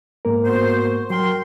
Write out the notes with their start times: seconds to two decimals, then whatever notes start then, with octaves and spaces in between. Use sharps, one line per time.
0.25 G#2 A#3 A#4
0.45 B3 F#4 C5
1.10 F#3 A#4 G5 C6